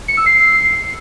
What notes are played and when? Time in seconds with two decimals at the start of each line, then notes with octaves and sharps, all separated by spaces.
0.08 C#7
0.17 E6
0.26 C7